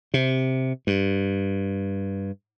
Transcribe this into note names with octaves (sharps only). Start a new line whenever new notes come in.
C3
G2